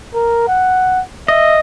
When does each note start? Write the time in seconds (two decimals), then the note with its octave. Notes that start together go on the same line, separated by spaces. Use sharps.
0.14 A#4
0.48 F#5
1.28 D#5 E5